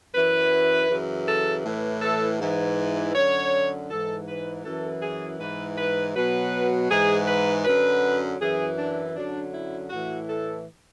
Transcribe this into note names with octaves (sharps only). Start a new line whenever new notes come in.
F#2 E3 B4
F#2 C#3 E3
A4
A2 E3
A4
G#2 E3
F#2 D3 F#3 C#5
G#2 E3 A4
B4
F#2 E3 A4
G#4
G#2 E3 B4
B4
B2 F#3 B4
G#2 E3 G#4
B4
F#2 D3 F#3 B4
F#2 E3 G#4
D4
F#2 D3 F#3 D4
E4
A2 E3 F#4
A4